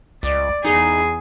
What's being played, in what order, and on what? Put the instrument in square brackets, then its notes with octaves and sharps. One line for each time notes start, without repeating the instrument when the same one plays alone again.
[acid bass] C#2 [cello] D5
[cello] E2 G#4 [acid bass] D#4